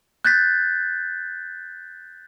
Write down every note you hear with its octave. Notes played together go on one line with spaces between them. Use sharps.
F#6 G6 A6 B6